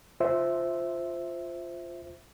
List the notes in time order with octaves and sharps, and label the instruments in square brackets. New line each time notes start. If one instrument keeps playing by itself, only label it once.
[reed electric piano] F4 C5 E5